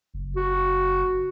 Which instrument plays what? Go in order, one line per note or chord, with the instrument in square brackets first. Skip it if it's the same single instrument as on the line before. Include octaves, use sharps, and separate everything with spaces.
[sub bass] F#1
[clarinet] F#4